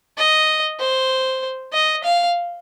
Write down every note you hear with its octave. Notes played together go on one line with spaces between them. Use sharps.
D#5
C5
D#5
F5